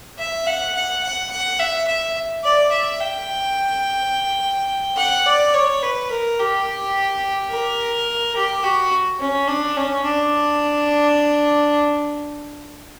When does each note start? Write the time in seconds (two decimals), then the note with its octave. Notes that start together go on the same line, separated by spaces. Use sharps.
0.19 E5
0.47 F#5
0.75 F#5
1.04 F#5
1.31 F#5
1.60 E5
1.88 E5
2.44 D5
2.71 E5
3.00 G5
4.97 F#5
5.26 D5
5.54 C#5
5.82 B4
6.10 A#4
6.39 G4
7.51 A#4
8.36 G4
8.64 F#4
9.20 C#4
9.48 D4
9.76 C#4
10.05 D4